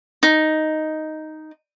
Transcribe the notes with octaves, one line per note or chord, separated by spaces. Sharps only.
D#4